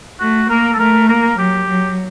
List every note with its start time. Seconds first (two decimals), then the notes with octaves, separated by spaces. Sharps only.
0.20 A3 F#4
0.49 A#3 A#4
0.73 A4
0.79 A3 A#4
1.08 A#3 A#4
1.38 F#3 G4
1.68 F#3